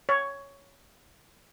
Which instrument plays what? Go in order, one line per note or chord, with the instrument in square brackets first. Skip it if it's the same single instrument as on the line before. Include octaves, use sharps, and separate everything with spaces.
[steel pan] C#5